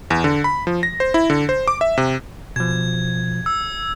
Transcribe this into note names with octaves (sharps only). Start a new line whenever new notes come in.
E2
D3
B5
F3
A#6
C5
E4
D3
C5
D6
E5
C3
B2 F3 G#6
E6